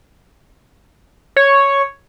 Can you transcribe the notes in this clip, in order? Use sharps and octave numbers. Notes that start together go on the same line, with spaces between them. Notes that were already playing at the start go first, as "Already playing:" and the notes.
C#5